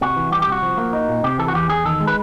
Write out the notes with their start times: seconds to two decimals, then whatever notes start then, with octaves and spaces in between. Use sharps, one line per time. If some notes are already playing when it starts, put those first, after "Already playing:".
0.01 C3 F#4
0.16 E3
0.32 G3 G4
0.42 G4
0.47 C2
0.52 F#4
0.63 F3
0.78 A#3
0.93 D#4
1.08 A#2
1.24 C3 G4
1.39 E3 A4
1.48 F#4
1.55 E2 G4
1.69 E2 G#4
1.85 D#3 A4
2.00 G#3
2.07 B4